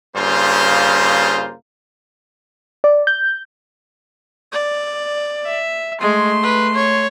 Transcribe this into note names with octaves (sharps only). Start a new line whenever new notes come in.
G2 C#3 A#3 F4 C5
D5
G6
D5
E5
G#3 A3 C6
B4
C#5